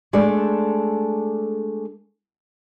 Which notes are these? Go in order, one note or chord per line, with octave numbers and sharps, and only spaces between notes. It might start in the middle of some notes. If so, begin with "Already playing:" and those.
G#3 A3 D4 A4 D5